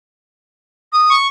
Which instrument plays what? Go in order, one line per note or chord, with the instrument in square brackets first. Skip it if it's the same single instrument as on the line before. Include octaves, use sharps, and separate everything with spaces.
[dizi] D#6
[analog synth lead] C#6